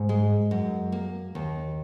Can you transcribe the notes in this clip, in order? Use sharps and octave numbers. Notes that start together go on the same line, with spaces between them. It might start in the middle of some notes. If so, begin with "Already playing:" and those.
Already playing: G#2
G#3
F#2
A#3
D#2